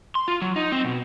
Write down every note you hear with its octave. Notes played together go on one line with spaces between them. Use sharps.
C6
F4
F#3
D#4
C4
B2